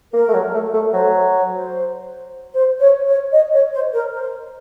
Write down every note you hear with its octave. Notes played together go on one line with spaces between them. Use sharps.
A#3 A#4
A3
F#3
A3
A3
F#3 C5
C5
C#5
C5
C5
C#5
C#5
D#5
C#5
C5
A#4
C5